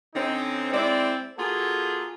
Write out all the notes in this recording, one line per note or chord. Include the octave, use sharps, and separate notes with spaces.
D3 C4 C#4 D#4
G#3 C4 E4 D5
A#3 F4 F#4 G#4 A4 G#5